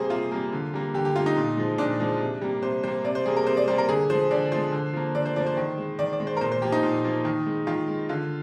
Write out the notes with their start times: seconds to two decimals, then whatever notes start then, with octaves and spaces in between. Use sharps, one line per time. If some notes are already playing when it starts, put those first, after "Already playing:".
Already playing: C3 G3 A#3 G#4 C5
0.10 C3 F4
0.31 G3 A#3
0.53 D3
0.74 G3 A#3
0.94 D3 G4
1.05 G4
1.16 G3 A#3 F4
1.26 D#4
1.36 A#2
1.57 F3 G#3
1.78 A#2 D4
2.00 F3 G#3
2.20 C3
2.41 G3 A#3
2.63 C3 C5
2.83 G3 A#3 C5
3.05 C3 D5
3.15 C5
3.26 G3 A#3 G#4
3.36 A#4
3.47 C3 C5
3.57 D5
3.68 G3 A#3 C5
3.78 A#4
3.88 D3 G#4
4.10 F3 G#3 C5
4.31 D3 D5
4.52 F3 G#3 C5
4.72 D3
4.93 F3 A#3
5.15 D3 D5
5.26 C5
5.36 F3 A#3 D5
5.46 C5
5.57 D#3
5.78 G#3
5.99 D#3 D5
6.13 D5
6.20 G#3
6.27 C5
6.37 A#4
6.41 A#2 C5
6.52 C5
6.62 F3 A#3 G4
6.72 D#4
6.83 A#2
7.04 F3 A#3
7.25 D#3
7.46 G#3
7.67 D#3 F4
7.88 G#3
8.09 D3 F4